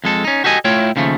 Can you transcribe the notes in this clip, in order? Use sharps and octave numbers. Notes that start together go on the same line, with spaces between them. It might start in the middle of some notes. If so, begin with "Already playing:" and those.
F2 G#3 A4
C#4 D#4
F#4 G4 A4 D#5 G#5
A2 A3 E4 F4 C#5 G5
D#2 C#3 F3 A3